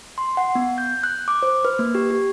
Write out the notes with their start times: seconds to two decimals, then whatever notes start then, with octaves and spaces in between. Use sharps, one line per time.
0.18 C6
0.37 F#5
0.55 B3
0.78 G6
1.03 F#6
1.28 D6
1.43 C5
1.65 B4
1.79 A#3
1.95 G4
2.11 G4